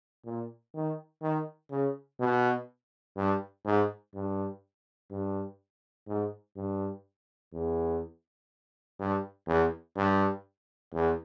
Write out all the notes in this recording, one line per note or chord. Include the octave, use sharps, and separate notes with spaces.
A#2
D#3
D#3
C#3
B2
G2
G#2
G2
G2
G#2
G2
E2
G2
E2
G2
E2